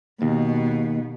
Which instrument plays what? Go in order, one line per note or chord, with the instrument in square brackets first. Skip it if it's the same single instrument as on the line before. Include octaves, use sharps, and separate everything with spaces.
[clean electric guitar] D#2 [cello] B2